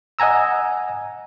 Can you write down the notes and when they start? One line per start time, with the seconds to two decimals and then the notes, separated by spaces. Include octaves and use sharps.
0.19 D#5 F#5 G#5 A#5 E6